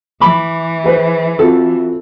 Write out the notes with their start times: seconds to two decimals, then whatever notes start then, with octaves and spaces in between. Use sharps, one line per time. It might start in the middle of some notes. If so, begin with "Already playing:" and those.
0.21 E3 B5 D6
0.84 G#4 B4 C5
1.39 C4 F4 F#4 A4